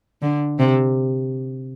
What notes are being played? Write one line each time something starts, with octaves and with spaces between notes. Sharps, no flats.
D3
C3